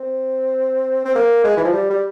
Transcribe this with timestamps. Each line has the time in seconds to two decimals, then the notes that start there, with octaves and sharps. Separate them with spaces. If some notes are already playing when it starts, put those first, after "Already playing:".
Already playing: C4
1.05 C4
1.15 A#3
1.44 G#3
1.57 E3
1.64 F3
1.73 G3
1.90 G3